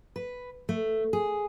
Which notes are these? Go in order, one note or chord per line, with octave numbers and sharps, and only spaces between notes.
B4
A3
G#4